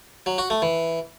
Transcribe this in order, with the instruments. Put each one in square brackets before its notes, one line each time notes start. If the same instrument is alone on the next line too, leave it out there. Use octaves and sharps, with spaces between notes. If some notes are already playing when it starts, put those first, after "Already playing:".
[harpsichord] F#3
F#4
A3
E3